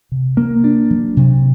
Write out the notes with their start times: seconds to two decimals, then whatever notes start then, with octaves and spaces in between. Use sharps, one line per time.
0.12 C3
0.37 A#3
0.64 D4
0.91 F#3
1.17 C3